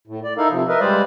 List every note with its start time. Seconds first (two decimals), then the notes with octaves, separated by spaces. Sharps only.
0.07 A2
0.24 D5
0.38 D#4 E4 A4 A#4 F5
0.50 C3 F3
0.69 A#4 B4 D#5 E5
0.80 G3 G#3 B4 C5 D5 F5